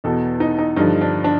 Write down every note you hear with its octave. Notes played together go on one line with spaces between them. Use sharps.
E2 B2 A4
D#4
D#4
G2 D3 F3 D#4
D4
D4